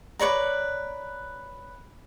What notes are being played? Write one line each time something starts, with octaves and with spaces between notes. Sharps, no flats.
B4 C#5 D5 A#5